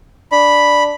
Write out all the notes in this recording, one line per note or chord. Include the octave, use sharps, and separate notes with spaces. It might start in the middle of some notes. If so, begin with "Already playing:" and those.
D4 B5